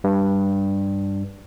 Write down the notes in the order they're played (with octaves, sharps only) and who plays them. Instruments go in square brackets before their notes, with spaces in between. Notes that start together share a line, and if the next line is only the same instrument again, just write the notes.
[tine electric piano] G2